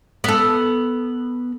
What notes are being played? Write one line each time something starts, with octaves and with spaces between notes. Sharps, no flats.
B3 A4